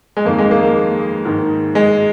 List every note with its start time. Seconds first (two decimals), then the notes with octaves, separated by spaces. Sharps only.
0.17 G#3
0.25 F2 D#3 A#3
0.38 G#3
0.51 A#3
0.62 A#3
1.25 G#2 D#3
1.75 G#3